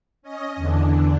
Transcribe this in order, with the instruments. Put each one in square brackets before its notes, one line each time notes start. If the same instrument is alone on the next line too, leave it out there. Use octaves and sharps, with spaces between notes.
[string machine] C#4 D#5
E2 D3 E3 D4